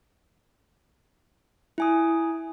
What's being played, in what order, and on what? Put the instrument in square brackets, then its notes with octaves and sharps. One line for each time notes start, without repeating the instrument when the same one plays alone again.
[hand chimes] E4 G#5 D#6